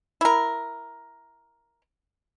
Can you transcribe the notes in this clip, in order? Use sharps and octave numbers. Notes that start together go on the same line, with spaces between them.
E4 A#4